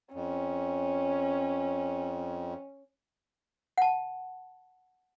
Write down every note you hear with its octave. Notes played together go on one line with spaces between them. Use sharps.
F2 C#4
F#5 A5